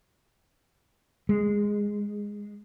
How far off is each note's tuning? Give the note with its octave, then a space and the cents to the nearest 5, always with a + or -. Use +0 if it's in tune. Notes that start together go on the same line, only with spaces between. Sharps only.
G#3 -10